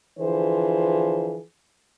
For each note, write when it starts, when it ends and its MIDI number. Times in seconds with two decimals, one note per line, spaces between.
0.19 1.39 50
0.19 1.39 52
0.19 1.39 53
0.19 1.39 68
0.19 1.39 72